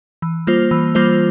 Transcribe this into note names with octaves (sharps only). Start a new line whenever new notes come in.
E3
G3 A#3 F4 C5
E3
G3 A#3 F4 C5